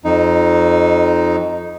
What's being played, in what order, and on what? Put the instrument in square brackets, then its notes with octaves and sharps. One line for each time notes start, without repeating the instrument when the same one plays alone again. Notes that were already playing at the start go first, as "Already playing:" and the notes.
[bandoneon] F2 D#4